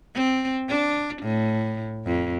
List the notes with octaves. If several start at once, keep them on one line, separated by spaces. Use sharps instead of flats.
C4
D4
A2
F2